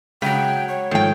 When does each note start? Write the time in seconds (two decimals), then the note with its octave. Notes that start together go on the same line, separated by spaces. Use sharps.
0.22 C#3 F#3 G#3 G5
0.68 C#5
0.91 G#2 D#3 F3 A3 G5